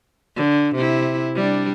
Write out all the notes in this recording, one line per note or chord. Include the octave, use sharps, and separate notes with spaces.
D3
C3 E4
G3 D4